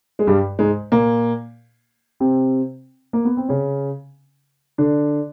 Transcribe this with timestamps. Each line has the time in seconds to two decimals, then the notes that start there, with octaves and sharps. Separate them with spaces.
0.19 G#3
0.27 G2 G3
0.59 G#2 G#3
0.92 A#2 A#3
2.20 C3 C4
3.13 A#3
3.25 B3
3.37 C4
3.49 C#3 C#4
4.78 D3 D4